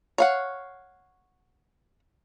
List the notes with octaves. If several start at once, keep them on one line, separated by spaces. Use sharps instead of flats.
C#5 F5 F#5